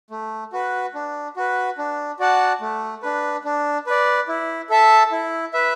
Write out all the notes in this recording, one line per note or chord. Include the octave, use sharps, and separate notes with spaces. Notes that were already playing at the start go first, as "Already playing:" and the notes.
A3
F#4 B4
D4
F#4 B4
D4
F#4 D5 F#5 A5
A3
D4 B4
D4
B4 D5
E4
A4 E5 A5
E4
B4 E5